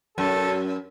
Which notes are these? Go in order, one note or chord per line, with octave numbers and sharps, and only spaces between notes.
F#2 A4